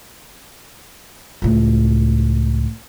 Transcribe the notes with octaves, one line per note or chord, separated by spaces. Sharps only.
C#2 A2